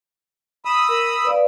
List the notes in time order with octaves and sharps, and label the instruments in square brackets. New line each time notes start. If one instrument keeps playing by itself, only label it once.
[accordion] B5 D#6 E6
[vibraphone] A#4
B4 D5 F5